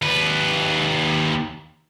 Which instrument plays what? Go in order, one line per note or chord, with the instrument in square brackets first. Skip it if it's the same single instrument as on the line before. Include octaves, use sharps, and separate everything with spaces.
[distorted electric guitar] D#2 B4